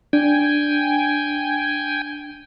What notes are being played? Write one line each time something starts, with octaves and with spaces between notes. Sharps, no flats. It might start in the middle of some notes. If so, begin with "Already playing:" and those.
D4 G5 G#5